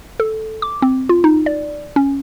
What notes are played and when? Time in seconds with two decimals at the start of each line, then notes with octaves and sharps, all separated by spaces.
0.20 A4
0.62 D6
0.82 C4
1.09 F4
1.24 D#4
1.46 D5
1.96 C#4